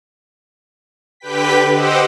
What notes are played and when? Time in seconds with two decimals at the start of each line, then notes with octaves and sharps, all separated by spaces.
1.20 D3 G4 B4 G5 B6
1.72 G4 C5 D#5 F#5 D6 E6